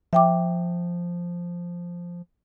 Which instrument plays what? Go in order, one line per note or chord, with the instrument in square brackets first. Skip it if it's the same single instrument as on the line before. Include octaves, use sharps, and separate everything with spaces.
[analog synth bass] F3 [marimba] E5 G5 D6